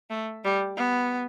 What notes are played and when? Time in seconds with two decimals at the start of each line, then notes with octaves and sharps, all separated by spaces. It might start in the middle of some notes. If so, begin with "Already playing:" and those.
0.10 A3
0.44 G3
0.77 B3